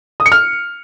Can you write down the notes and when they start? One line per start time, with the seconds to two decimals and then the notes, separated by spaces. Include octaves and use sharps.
0.20 D#6
0.26 C#7
0.32 F6